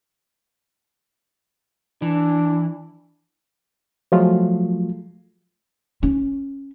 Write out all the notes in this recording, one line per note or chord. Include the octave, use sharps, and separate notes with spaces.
E3 D4
F3 F#3 G#3 A3 F4
C#4